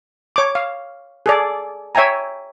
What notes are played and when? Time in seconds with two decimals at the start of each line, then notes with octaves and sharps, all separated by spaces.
0.36 C#5 D6
0.55 F5
1.26 G#4 A4 D5
1.95 C#5 E5 G5 G#5 A#5